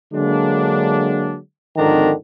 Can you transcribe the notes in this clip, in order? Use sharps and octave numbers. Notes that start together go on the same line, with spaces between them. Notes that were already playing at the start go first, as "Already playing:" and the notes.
D3 F#3 G#3 A#3 D4
G#1 F2 D3 D#3 D4 A#5